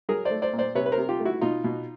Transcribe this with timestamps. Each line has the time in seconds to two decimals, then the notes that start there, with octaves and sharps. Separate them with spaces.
0.09 F#3 G#4 A#4
0.25 C5 D5
0.31 A3
0.42 C5 D5
0.53 A#2
0.58 C5 D5
0.75 C3 B4 C#5
0.86 B4
0.92 A#4 C5
0.98 C3
1.09 F4 G4
1.20 A3
1.25 E4 F#4
1.41 B2 D#4 F4
1.64 B2